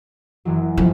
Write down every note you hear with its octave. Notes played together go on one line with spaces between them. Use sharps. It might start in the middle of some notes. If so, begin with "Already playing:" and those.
F#1 E3 F#3
G1 F3 A4